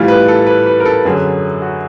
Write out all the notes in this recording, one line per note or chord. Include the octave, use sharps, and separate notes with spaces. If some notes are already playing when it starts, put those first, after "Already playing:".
Already playing: A2 E3 G3 F4
B4
A4
B4
B4
A#4
A4
F#2 D3 F#3 G#4
F#4